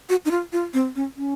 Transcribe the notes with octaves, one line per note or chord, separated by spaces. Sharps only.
F#4
D#4
F4
F4
C4
C#4
C#4